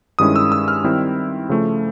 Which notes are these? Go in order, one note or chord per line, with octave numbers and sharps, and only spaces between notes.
G2 D#3 G#3 C#4 E4 D#6
E6
E6
F6
D#3 G3 C4 E4
C#3 F3 A3